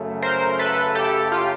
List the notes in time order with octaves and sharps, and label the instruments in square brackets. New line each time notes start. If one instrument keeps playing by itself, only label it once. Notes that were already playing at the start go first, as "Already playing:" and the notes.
Already playing: [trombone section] F#2 C#3 F#3 A3
[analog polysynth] A#4 C5
A4 B4
G4 A4
F4 G4